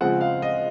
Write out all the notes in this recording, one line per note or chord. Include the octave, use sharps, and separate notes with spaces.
C#3 F3 G#3 C4 F#5
F5
D#5